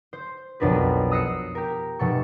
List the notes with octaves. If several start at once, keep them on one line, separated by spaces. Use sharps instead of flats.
C5
B1 F2 D4 A#4 B4
D#6 E6 F#6 A#6 C7 C#7
G4 A#4
F1 B2 A4 C#6